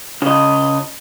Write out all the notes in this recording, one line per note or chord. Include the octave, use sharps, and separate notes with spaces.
C#3 D#5